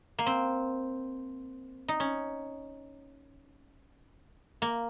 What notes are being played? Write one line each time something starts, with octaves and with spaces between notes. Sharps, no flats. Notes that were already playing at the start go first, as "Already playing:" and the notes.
A#3
C4
D#4
C#4
A#3